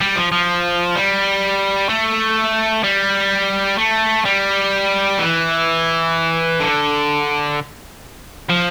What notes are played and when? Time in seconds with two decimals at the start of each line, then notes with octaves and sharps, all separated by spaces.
0.01 G3
0.16 F3
0.32 F3
0.95 G3
1.89 A3
2.83 G3
3.78 A3
4.25 G3
5.19 E3
6.60 D3
8.49 F3